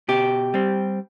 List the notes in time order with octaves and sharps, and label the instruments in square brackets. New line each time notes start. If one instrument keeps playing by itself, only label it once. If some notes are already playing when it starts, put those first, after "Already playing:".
[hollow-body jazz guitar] B2 G4
G3 C4